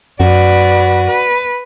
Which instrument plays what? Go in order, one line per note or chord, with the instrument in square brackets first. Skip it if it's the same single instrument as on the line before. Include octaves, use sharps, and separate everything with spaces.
[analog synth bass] F#2 [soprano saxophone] F#4 [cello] B4 D5
[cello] B4